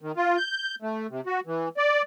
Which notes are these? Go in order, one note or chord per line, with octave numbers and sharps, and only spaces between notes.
D#3
F4
G6
A3
C3
F#4
E3
D5